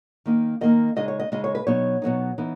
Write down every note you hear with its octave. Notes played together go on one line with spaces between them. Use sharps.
D#3 A#3 D#4
D#3 A#3 D#4 D#5
C#3 G#3 D#4 D#5
C#5
D#5
C#3 G#3 D#4 D#5
C#5
B4
B2 F#3 B3 D#4 C#5
B2 F#3 B3 D#4
E3 B3 D#4